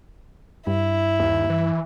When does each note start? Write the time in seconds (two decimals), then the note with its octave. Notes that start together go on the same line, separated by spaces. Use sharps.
0.67 G2 E4
1.20 D#2
1.50 E3